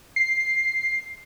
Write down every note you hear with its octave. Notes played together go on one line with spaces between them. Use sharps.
C7